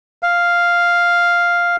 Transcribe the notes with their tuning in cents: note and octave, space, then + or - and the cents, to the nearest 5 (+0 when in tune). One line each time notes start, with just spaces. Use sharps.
F5 +0